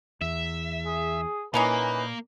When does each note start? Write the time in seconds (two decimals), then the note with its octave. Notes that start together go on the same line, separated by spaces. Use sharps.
0.21 E2 E5
0.86 G#4
1.54 A#2 E3 A#3 C#4 D#4 B4